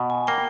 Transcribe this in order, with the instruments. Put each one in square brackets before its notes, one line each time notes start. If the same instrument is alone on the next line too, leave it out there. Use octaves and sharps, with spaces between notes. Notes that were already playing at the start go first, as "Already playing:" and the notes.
Already playing: [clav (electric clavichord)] B2
[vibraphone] G#5
[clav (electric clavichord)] A#3 [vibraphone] G5